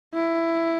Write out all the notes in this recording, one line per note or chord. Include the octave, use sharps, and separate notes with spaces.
E4